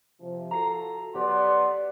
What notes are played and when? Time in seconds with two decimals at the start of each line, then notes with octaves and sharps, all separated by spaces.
0.20 C3 F3
0.51 F4 F#4 A4 A#5 C7
1.15 F#3 B3 G4 D5 F#5 C6